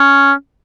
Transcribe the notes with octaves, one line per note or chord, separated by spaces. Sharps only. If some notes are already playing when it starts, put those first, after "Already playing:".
Already playing: C#4